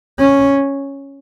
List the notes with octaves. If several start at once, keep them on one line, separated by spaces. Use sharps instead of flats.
C#4